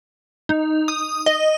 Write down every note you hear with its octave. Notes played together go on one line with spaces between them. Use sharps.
D#4
D#6
D#5